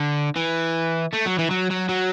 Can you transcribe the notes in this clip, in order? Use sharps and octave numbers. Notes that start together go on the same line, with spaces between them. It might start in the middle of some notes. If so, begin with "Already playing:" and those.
Already playing: D3
E3
A3
F#3
E3
F#3
F#3
F#3